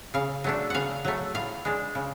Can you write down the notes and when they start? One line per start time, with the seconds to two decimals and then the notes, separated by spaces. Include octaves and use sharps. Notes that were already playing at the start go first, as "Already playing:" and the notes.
0.14 C#3 F5
0.44 F#3 A3 D4
0.70 C#3 F5 F#5
1.05 F#3 A3
1.34 A2 F5
1.65 G#3 D4
1.95 C#3